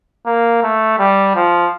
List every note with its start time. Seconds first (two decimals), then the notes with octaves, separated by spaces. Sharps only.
0.26 A#3
0.63 A3
0.99 G3
1.35 F3